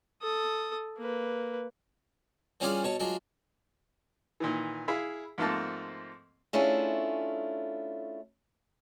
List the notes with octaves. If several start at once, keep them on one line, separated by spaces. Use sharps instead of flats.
A4 D#6
A#3 B4
E3 G3 C#4 F4 G#4 D5
B2 C#5 A5
F#3 G#3 D4 F4
A#2 D#3 E3
E4 G#4 E5 F5
G#2 F3 A3 A#3 C4 A5
A3 C#4 D4 E4 F4 G#4